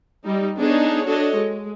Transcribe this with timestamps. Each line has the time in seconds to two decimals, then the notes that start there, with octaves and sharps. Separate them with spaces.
0.24 G3 D#4
0.58 B3 D4 D#4 G#4 C#5
1.06 D4 F#4 A4 C#5 D#5
1.36 G#3